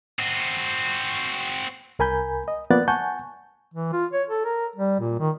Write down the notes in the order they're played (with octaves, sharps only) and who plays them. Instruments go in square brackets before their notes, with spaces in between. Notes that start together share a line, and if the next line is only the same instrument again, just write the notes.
[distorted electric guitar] C4 F#4
[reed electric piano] C2 A#4 G#5 B5 G6
D#5
F3 A#3 B3 D5 F#6 A6
F#5 G#5 A5 C#6 G6
[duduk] E3
F4
C#5
A4
A#4
G3
A#2
D#3